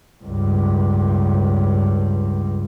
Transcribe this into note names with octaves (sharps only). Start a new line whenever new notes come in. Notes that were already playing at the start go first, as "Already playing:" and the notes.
C#2 G2